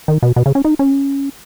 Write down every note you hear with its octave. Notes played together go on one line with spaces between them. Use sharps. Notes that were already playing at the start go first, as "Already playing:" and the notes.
D#3
B2
B2
C#3
C#4
D#4
C#4